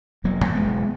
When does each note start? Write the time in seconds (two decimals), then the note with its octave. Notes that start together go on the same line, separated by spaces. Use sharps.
0.24 E1 F#3 A#3
0.45 E2
0.55 G#3 B3
0.64 E1